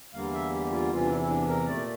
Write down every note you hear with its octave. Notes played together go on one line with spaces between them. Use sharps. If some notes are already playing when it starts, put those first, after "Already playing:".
E2 D3 G3 A#3 F5
E5
G4
F4
E2 C3 E3 F4
D4
E4
E4
D4
A#4
A#2 A3 D5